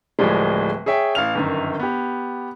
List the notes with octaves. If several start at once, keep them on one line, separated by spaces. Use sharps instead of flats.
D1 A2 F3 G3 G#3
G#4 C#5 E5 G5
A1 F5 F6 F7
G1 F#2 D#3
B3 G4